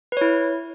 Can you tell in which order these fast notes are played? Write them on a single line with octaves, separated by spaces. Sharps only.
B4 C#5 E4